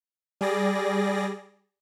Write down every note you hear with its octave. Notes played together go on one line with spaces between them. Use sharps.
G3 G#4 D5 A#6